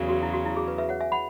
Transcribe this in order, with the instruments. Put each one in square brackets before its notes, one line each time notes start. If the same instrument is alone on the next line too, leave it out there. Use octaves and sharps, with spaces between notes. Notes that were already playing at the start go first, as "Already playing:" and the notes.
Already playing: [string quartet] E2 C#3 F#3
[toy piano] F#4
E4
F#4
E4
G#4
B4
B4 E5
C#5 F#5
E5 G#5
F#5 B5